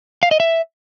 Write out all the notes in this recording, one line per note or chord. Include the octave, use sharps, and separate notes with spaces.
F5
D#5
E5